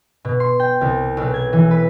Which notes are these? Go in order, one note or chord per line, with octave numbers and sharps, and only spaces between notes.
B2
C6
G5
C2
B1
G#6
E3
B4